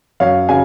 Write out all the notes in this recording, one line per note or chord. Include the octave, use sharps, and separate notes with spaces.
F#2 C#5 F5
C#3 F#3 F5 G#5